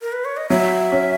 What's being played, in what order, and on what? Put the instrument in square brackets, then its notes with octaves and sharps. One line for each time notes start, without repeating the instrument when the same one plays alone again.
[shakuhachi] A#4
B4
C#5
D#5
[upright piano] F#3 [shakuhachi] E5
[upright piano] C#4